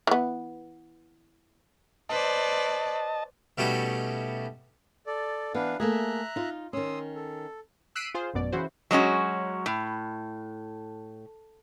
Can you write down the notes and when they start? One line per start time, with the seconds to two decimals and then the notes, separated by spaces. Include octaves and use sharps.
0.07 E3 B3
2.09 B4 C5 D5 D#5 A5
3.58 B2 G3 A3 C#4 D#4 F#4
5.07 A4 D5
5.54 E3 B3 D4 B4 F5
5.80 A3 A#3 G#4 E5 A#5 F#6
6.36 D#4 F4
6.73 D#3 C#4 C6 D#6 E6
7.15 A4
7.95 E6 F#6 B6 C7 D7 D#7
8.15 F4 G#4 C5
8.34 A1 F#2 B2 D5
8.52 C#3 E3 E4 F#4 C5
8.91 F#3 G#3 C#4 F#4
9.66 A2